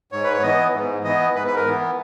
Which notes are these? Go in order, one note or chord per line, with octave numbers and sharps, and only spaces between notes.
G#2 C#5
B4
C#5
E3 B3 D#5
G#2
E3 B3 D#5
G#2 B4
B4
A#4
E3 B3